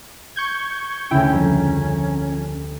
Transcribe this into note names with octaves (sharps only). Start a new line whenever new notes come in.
C#6 G6 G#6
D2 C#3 C#4 E4 G5
F2 G3 A#3